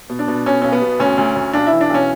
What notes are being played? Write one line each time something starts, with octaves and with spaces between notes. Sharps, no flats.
B2
D4
B2
B2 C#4
B1 C#4
B3
B2
D2 C#4
D2
D2
B1 D4
E4
E3
D4
B1 C#4